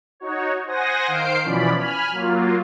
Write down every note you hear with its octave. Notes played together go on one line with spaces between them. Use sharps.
D#4 F#4 C#5
C5 F#5 G#5 D#6 A#6
D#3 C5 F5 C7 D7
B2 E3 F3 C#4 D5 B5
G#5 B5 F6
F#3 A#3 F4